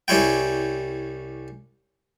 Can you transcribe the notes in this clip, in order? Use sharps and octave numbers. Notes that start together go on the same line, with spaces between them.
C2 G3 C#4 E4 G5